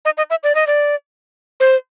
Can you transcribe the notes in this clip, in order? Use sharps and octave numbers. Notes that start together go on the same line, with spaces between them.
D#5
D#5
E5
D5
D#5
D5
C5